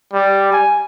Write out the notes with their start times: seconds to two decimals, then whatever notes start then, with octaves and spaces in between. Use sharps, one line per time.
0.13 G3
0.53 G#5